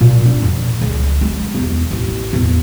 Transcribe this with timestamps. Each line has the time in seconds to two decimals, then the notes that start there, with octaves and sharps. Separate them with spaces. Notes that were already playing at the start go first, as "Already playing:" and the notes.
0.01 A#2
0.25 D4
0.42 F2
0.81 C#2
1.21 G#3
1.55 E2
1.91 A1
2.33 E2